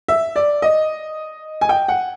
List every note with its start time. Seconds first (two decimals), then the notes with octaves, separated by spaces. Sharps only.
0.08 E5
0.36 D5
0.62 D#5
1.61 G#5
1.69 G5
1.88 F#5